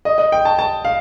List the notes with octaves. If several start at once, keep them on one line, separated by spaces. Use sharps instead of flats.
D#5
D#5
G5
A5
A5
F5